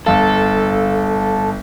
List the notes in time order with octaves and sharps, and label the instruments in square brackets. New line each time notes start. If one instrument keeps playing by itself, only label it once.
[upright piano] G1 F5 [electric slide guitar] A4